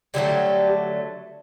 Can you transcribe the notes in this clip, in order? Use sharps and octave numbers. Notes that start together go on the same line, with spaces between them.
D3 F#3 G3 A3 G4